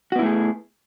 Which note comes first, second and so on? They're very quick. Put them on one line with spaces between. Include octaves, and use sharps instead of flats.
F#4 B3 E4 A3 G#4